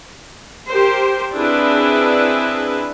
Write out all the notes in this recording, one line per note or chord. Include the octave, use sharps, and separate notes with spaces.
G4 A#4 C5
C4 D4 E4 G#4 B4